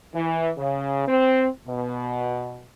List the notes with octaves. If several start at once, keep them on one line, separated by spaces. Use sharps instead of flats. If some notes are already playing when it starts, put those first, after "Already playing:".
E3
C#3
C4
B2